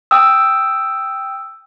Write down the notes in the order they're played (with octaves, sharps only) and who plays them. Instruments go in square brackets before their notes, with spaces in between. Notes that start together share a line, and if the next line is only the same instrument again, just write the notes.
[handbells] G5 D#6 E6